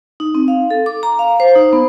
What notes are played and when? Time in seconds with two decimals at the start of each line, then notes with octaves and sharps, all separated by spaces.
0.20 D#4
0.35 C4
0.48 F5
0.71 A4
0.86 D6
1.03 A#5
1.19 F5
1.40 C5
1.55 D#4
1.73 B3